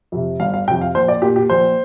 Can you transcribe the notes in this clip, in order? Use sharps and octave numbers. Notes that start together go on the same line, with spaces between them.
F2 C3
G1 F5
F5
F2 C3 G5
F5
A#1 C5
D5
A#2 G4
G4
A#1 C5